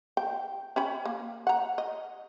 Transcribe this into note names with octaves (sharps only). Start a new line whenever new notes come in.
G5
C#4 G5 B5
A#3
F#5 A#5
D#5